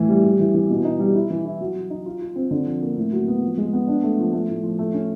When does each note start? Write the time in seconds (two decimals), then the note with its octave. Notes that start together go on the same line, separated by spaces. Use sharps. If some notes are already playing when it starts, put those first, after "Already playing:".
Already playing: A2 E3
0.08 G3
0.24 G3
0.39 E3
0.54 E3
0.70 B2
0.85 D#4
0.99 G3
1.15 E4
1.30 E3
1.45 E4
1.61 F#3
1.76 F#3
1.90 D#4
2.06 F4
2.22 F4
2.36 C4
2.51 D3
2.66 F3
2.82 A#3
2.97 A2
3.12 F#3
3.28 B3
3.42 F3
3.58 G#3
3.73 B3
3.88 D4
4.03 A3
4.19 F3
4.33 A3
4.49 A2
4.64 F3
4.79 A3
4.94 C#4